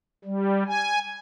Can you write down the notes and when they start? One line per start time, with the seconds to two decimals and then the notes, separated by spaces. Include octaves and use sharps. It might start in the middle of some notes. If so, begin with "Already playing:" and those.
0.25 G3
0.67 G#5